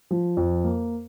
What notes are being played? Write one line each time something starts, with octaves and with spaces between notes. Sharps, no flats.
F3
F2
A#3